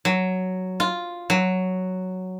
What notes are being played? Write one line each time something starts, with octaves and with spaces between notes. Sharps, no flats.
F#3
F4
F#3